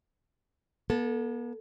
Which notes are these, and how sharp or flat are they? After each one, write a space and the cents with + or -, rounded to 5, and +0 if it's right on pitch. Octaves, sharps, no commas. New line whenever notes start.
B3 -45 A4 +0